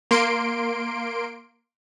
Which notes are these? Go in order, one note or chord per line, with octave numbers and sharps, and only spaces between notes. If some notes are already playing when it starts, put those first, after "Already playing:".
A#3 C6 D7